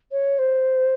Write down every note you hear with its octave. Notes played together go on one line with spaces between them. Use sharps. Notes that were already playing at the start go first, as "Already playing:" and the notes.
C#5
C5